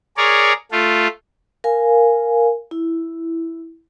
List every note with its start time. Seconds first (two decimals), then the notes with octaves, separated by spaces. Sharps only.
0.17 G#4 A#4 C#5 D5
0.72 A3 F4
1.64 A#4 F5 G#5
2.71 E4